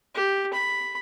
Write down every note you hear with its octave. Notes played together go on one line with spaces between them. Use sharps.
G4
B5